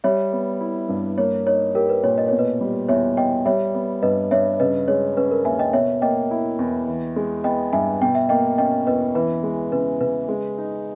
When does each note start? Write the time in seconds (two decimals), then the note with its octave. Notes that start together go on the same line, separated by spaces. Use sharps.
0.04 G3 C#5 E5
0.33 B3
0.61 E4
0.89 G2
1.18 A#3 C#5
1.46 D#4 C#5
1.75 G4 A#4
1.89 B4
2.03 A#2 C#5
2.18 D#5
2.28 B2 C#5
2.39 B4 D#5
2.61 G3
2.89 E2 C#5 E5
3.17 E2 D#5 G5
3.46 G3 C#5 E5
3.75 B3
4.02 G2 B4 D#5
4.31 G2 C#5 E5
4.60 C#3 B4 D#5
4.88 G#3 C#5
5.17 C#4 B4
5.31 A#4
5.45 D#2 E5 G#5
5.59 D#5 G5
5.73 B2 C#5 E5
6.02 A#3 D#5 G5
6.31 E4
6.59 E2
6.88 E3
7.16 G#3
7.44 B3 D#5 G5
7.73 G2 E5 G#5
8.01 B2 G5
8.15 E5
8.29 A#3 D#5 G5
8.58 C#4 D#5 G5
8.87 E2 B4 D#5
9.15 E3 B4
9.43 G#3
9.72 C#3 B4
10.01 C#3 B4
10.29 G#3
10.58 D#4